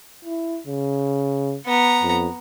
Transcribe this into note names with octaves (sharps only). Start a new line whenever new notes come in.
E4
C#3
B3 A#5
F2